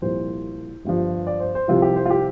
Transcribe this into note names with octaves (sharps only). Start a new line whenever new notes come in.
C2 A#2 F3 C5
G1 G2 F3
D5
C5
C5
C2 C3 F3 F4
G4
C5
F4
G4